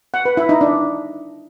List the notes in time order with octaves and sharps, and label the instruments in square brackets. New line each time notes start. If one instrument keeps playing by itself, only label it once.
[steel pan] F#5
B4
E4
D#4
D4